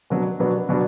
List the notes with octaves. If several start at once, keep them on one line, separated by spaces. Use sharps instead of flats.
B2 F#3 B3 D4
B2 F#3 B3 D4
B2 F#3 B3 D4